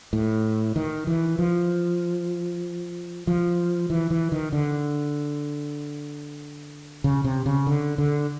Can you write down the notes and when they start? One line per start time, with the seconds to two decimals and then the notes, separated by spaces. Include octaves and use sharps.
0.13 A2
0.76 D#3
1.07 E3
1.39 F3
3.27 F3
3.90 E3
4.10 E3
4.32 D#3
4.52 D3
7.04 C#3
7.24 C3
7.46 C#3
7.67 D3
7.98 D3